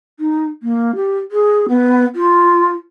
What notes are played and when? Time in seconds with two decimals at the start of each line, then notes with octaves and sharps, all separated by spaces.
0.19 D#4
0.62 A#3
0.95 G4
1.31 G#4
1.68 B3
2.15 F4